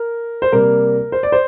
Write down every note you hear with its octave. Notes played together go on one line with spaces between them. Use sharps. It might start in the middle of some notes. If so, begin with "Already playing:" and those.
Already playing: A#4
C5
C3 G3 A#3 A#4
C5
D5
C5